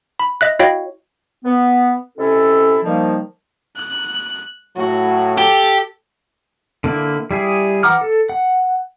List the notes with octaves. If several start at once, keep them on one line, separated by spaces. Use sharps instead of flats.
B5
D#5 E5 F#6
E4 F#4 C#5 D#5 F5 G5
B3
C3 G#3 C#4 E4 A4
D#3 F3 G3 A#3
F#6
A2 F#3 F#4
G4 A4
D3 A#3 E4
G3 E4 G#4
E3 F#5 A#5 D6 F6
A4
F#5